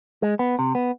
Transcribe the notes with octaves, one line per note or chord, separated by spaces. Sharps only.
G#3
B3
C3
B3